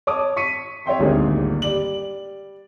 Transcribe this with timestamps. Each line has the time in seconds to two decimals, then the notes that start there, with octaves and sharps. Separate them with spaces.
0.07 C#5 A5 D6 D#6
0.36 C#6 B6 C#7 D#7
0.86 C#5 E5 G5 C6
0.99 D#1 G#1 D2 A#3 D#4 G#4
1.62 G3 D5 F#7